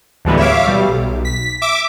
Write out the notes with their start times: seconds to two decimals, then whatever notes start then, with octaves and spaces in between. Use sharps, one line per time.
0.25 D2 A2 E3 G3 G#3 B3
0.37 C#5 E5 F5 D6
0.67 B2 G3
0.88 B1
1.25 B6
1.62 E5 D6